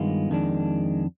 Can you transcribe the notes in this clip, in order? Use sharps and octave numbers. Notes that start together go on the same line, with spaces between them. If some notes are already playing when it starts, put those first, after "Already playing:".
Already playing: G2 D#3 G#3 B3 F4
F2 D#3 G#3 D4